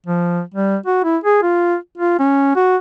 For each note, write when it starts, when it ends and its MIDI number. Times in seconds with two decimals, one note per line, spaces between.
0.07 0.42 53
0.54 0.76 55
0.86 1.01 66
1.04 1.17 64
1.24 1.39 68
1.43 1.76 65
1.98 2.18 65
2.19 2.55 61
2.56 2.77 66